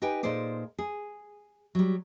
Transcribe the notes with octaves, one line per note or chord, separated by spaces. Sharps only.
D#4 G4 B4 G5 G#5
A#2 D#4 G#4 A4 C5 D5
G#4
F#3 G3